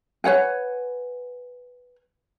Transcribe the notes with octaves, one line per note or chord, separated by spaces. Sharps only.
B4 C#5 F#5 G#5